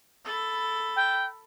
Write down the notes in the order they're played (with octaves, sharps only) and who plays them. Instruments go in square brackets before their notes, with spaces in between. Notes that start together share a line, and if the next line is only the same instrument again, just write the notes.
[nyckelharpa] A4 B5
[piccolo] G5